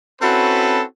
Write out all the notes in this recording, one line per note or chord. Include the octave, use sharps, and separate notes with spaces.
C4 C#4 E4 F#4 A4 B4